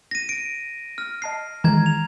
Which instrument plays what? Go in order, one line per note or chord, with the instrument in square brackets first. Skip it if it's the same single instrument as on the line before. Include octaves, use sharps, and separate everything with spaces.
[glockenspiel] A#6 D#7
D7
F6
[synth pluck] D#5 A5 F6 [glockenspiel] C7
[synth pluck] D#3 E3 G#3 [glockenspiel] A#5 G#6
[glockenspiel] F7